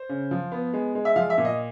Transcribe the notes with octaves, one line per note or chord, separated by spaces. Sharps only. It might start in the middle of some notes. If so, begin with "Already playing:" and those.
Already playing: C5
C#3
F3
B3
G#3
G#3
E5
F3 F5
E5
A#2
D#5